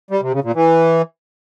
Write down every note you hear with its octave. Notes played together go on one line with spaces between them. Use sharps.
G3
C3
C#3
A#2
E3